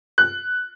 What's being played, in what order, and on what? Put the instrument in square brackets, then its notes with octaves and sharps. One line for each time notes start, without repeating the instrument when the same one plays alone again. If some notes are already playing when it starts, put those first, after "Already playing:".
[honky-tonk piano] F#6